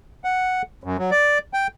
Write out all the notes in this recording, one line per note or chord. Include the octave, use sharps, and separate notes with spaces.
F#5
F#2
F#3
D5
G5